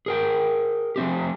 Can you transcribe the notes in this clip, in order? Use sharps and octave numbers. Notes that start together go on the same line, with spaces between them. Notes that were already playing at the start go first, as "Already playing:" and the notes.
G#4 A#4 G5
F3 A3 C4 G4